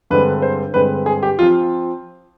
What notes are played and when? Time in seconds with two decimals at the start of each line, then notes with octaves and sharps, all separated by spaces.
0.10 G2 D3 G#3 C4 B4
0.42 C5
0.74 G2 D3 G#3 C4 B4
1.06 G#4
1.23 G4
1.39 F3 C4 F4